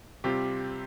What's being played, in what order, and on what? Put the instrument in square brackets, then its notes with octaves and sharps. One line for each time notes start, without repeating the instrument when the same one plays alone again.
[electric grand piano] C3 G3 C4 F4 [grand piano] G4